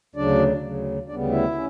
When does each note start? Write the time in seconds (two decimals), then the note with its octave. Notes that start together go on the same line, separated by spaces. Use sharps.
0.15 D2 C#3 F#3 D4 D5
0.61 D2 C#3 F#3
1.08 D2 C#3 G3 B3 D4 D5
1.31 E4 E5
1.54 C#4